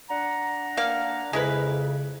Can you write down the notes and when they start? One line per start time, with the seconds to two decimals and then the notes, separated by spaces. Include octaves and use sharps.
0.10 D4 F#5 A#5
0.77 A#3 F5
1.33 F2 C#3 G#3 E4 B4